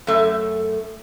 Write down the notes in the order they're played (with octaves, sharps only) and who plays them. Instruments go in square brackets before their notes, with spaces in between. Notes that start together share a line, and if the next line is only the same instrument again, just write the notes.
[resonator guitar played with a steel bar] F#2 A3